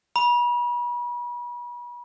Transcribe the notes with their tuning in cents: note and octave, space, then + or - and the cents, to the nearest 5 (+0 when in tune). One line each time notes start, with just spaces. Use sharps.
B5 -35